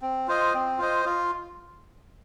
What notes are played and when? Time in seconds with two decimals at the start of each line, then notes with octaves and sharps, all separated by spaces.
0.02 C4
0.28 F4 C5 D#5
0.54 C4
0.79 F4 C5 D#5
1.05 F4